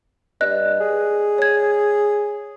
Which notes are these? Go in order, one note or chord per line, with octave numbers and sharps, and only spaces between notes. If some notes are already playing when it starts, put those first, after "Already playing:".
G2 D5 D#5 F#6
G#4
C#5 G#6